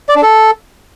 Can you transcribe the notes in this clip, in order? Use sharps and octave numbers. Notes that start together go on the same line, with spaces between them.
D5
D4
A4